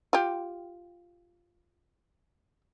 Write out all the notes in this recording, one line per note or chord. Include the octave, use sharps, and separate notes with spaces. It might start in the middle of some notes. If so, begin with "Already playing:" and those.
F4 G4